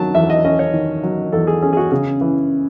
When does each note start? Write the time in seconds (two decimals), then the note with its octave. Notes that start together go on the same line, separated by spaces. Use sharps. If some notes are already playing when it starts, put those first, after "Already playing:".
Already playing: D#3 F#3 A5
0.15 E2 E5
0.30 D#5
0.44 C#4 D#5
0.59 C#5
0.74 D#3
1.03 F#3
1.33 E2 A4
1.47 G#4
1.62 C#4 G#4
1.73 G#4
1.77 F#4
1.91 C#3 G#4
2.21 E3